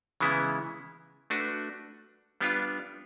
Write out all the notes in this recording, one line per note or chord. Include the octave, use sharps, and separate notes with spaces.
C#3 E3 G#3 B3 E4
A3 D4 F#4 B4
G3 B3 D4 F4